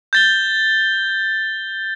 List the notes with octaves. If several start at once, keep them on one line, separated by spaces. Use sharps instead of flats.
G6 A6 G7